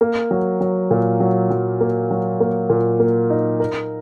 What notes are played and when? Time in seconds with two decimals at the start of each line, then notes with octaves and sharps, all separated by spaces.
0.01 A#3
0.31 F#3
0.61 F#3
0.91 A#2
1.20 F#3
1.50 F#3
1.80 A#3
2.11 F#3
2.40 A#3
2.70 A#2
2.99 A#3
3.30 D#4
3.60 A#4